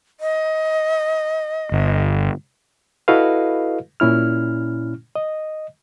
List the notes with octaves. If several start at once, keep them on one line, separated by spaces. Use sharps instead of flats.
D#5
G1
E4 F#4 A4 B4 D#5 F5
A#2 C#4 E4 F6
D#5